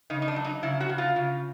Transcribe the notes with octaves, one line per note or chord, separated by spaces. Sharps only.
C#3 D#4
D#4
D4
F#3
D#4
C#3 E4
F#4
C#3
F4
C#3